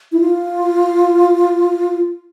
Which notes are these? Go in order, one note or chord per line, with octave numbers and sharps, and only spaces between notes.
E4
F4